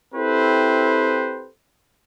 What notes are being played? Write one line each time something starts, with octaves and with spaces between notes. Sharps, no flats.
C4 E4 G4 A4 B4 C5